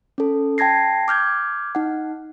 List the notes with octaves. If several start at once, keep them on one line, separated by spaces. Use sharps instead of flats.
C#4 A4
G5 A5 G#6 A#6 C7
D6 F6 G6 G#6
D#4 F#5